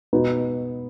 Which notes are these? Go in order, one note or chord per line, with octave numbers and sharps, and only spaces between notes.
B2 B3 D#4